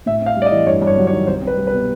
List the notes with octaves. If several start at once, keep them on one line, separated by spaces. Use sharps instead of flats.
A2 E5
C4
F5
G3
D5
D#5
E3
G2 C#5
G2
C#5
F#3
C#5
D#3
C2 C5
C4
B4
G3
B4
B2